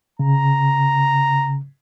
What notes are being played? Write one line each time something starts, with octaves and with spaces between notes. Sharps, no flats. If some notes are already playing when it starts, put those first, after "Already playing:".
C#3 A#5